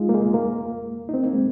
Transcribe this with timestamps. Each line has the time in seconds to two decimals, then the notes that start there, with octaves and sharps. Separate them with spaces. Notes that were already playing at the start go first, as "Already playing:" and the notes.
Already playing: G#3 D#4 F4
0.09 A#3
0.14 G#3
0.34 A#3
1.09 D#4
1.14 C4
1.23 A#3
1.33 G#3